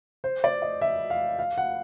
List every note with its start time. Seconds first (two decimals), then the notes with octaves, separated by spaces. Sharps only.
0.24 C5
0.44 D5
0.62 D#5
0.81 E5
1.10 F5
1.39 F5
1.58 F#5